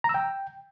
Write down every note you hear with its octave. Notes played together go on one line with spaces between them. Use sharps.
A#5
E6
G5